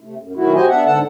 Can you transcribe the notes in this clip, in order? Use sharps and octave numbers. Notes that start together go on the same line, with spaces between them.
C3 A3
F#2
B2 D#3 F#3 A3 E4 F#4
F#4 G4 C5 D#5 G#5
B3 D4 E5 F#5
G#2 D3 A4 F#5 A5